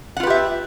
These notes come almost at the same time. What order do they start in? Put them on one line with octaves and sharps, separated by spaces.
F#5 F4 B4 G4 E5